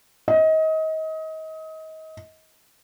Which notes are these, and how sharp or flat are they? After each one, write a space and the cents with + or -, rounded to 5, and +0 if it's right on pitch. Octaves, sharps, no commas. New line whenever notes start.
D#5 +30